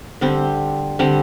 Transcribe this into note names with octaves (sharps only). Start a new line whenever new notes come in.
D3 G3 C4
D3 G3 C4